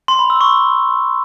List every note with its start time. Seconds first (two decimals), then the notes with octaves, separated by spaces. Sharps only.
0.08 C6
0.19 B5
0.30 E6
0.41 C#6